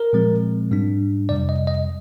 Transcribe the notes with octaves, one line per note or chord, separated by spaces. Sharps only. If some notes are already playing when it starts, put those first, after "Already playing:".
Already playing: A#4
A#2 F3 G#3 C4
G#2 G3 D4
F2 C3 G3 D5
D#5
D#5